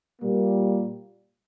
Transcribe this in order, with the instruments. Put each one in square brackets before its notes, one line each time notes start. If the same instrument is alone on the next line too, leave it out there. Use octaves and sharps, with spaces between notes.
[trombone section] A#2 G3 A#3